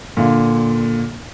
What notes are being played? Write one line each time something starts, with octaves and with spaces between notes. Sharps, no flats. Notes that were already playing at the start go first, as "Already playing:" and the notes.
A#2 D3 F5